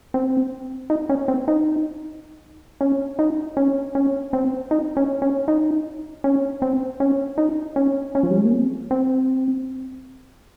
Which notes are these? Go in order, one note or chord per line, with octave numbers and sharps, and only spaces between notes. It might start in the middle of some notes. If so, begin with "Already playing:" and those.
C4
D#4
C#4
C4
D#4
C#4
D#4
C#4
C#4
C4
D#4
C#4
C#4
D#4
C#4
C4
C#4
D#4
C#4
C#4
F3
G3
G#3
A#3
C4
C4